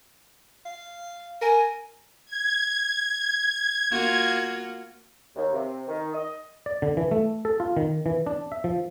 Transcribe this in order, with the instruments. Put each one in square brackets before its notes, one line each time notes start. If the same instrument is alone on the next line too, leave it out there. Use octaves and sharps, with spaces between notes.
[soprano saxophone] F5
[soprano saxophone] A#4 [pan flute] G#5
[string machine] G#6
[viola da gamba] A#3 F4 F#4
[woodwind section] D#2
C3
D#3
D#5
[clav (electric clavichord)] D5
D3
E3
A3
A4
F4
D#3
E3
D4
E5
F3